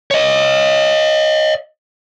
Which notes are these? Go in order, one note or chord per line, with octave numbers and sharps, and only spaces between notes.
C#5 D#5